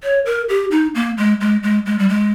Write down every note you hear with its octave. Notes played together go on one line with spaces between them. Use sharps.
C#5
A#4
G4
D#4
A#3
G#3
G#3
G#3
G#3
G3
G#3